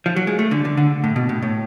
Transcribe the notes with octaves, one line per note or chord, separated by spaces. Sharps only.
F3
F#3
G#3
A3
D3
D3
D3
A2
B2
A2
A2